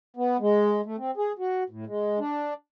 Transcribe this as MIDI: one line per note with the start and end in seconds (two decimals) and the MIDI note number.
0.17 0.37 59
0.40 0.81 56
0.85 0.96 57
0.98 1.11 60
1.17 1.32 68
1.39 1.63 66
1.70 1.85 45
1.87 2.19 56
2.19 2.54 62